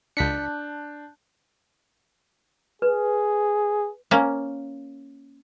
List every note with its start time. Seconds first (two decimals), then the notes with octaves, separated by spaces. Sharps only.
0.17 C#2 D4 A5 F#6 G6 B6 C#7
2.82 G#4 B4
4.11 A#3 C#4